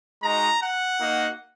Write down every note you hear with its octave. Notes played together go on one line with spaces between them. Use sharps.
G#3 D#4 F#4 A#5
F#5
A#3 D#4 F#4